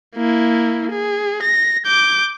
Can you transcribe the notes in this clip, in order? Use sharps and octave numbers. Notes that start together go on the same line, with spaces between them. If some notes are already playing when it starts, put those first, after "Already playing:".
A#3 E4
G#4
A#6
D6 G6